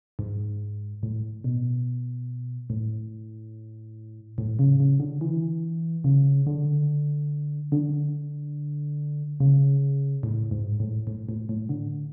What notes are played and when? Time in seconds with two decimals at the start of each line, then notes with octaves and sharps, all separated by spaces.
0.19 G#2
1.03 A2
1.44 B2
2.70 A2
4.38 A2
4.59 C#3
4.80 C#3
5.00 D3
5.21 E3
6.04 C#3
6.47 D3
7.72 D3
9.40 C#3
10.23 A2
10.51 G#2
10.80 A2
11.07 A2
11.29 A2
11.49 A2
11.69 D3